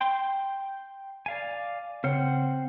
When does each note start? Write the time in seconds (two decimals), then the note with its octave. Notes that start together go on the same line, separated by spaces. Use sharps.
0.01 G5 C6
1.26 D5 F5 G#5
2.04 C#3 C4 C5 F#5